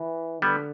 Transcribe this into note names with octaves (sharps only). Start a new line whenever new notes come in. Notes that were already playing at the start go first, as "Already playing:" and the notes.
Already playing: E3
D3 G3 B3